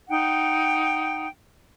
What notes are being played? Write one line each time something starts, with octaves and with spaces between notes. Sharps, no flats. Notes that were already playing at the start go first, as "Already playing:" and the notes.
D#4 F#5 G5